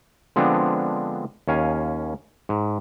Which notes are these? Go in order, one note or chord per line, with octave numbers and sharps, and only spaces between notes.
D3 F3 G#3 B3 C4 D4
D#2 C#4 F5 G#5
G#2